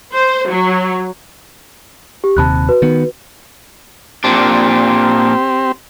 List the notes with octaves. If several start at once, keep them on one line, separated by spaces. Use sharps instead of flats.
C5
F#3
G4
D#1 D#2 C3 A5 B5 F#6
F#4 B4
D#3 B3
A#2 C4 D4 G4